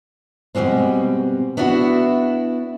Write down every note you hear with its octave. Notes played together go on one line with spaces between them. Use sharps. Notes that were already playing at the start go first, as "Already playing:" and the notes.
B2 F3 G3 G#3 C4
B3 D4 E4 F#4